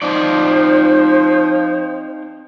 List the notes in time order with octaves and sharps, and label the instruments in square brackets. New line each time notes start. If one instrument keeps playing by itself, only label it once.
[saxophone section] F3 [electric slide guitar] C4 D#4 D5 [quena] C5